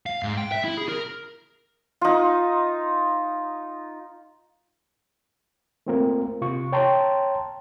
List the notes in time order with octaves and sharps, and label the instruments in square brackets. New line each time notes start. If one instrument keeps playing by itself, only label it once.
[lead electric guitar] F5
G#2
G5
E5
E4
G#4
A#4
[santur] D#4 F4
[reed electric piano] A3 A#3 C4 F4 A#4
C3 F4 C#6
C#5 G5 A5 A#5 C6